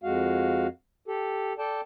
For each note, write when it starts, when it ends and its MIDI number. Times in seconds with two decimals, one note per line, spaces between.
0.03 0.67 41
0.03 0.67 56
0.03 0.67 66
0.03 0.67 77
1.08 1.53 67
1.08 1.53 69
1.59 1.81 69
1.59 1.81 74
1.59 1.81 79
1.59 1.81 81